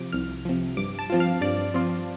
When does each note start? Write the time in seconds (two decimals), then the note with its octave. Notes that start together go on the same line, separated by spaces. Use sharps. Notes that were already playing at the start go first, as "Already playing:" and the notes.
Already playing: C3 F3 D6
0.12 C2 F6
0.45 C3 F3
0.77 G2 D6
0.99 A5
1.10 F3 C4 F4
1.20 F5
1.41 G2 D5
1.74 F3 C4 F4